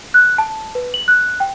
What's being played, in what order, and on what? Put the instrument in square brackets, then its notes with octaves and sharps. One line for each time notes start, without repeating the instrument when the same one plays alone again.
[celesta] F#6
A5
B4
F#7
F#6
G5